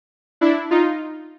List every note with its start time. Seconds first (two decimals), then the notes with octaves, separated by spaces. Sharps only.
0.41 D4 E4
0.71 D#4 F4